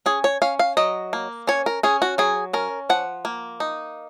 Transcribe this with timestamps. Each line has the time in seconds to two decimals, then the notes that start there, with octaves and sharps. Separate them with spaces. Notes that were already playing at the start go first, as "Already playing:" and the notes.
0.06 C#4 G#4
0.24 C#5
0.42 C#4 F5
0.59 F5
0.77 F#3 D#5
1.13 A#3
1.47 C#4 C#5
1.66 A#4
1.83 C#4 G#4
2.02 F#4
2.18 F#3 G#4
2.53 C#4 A#4
2.89 F3 F#5
3.25 A#3
3.60 D#4